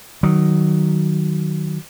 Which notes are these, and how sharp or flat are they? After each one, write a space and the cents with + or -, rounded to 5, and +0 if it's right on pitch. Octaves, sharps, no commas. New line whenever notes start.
D#3 -5 F#3 +15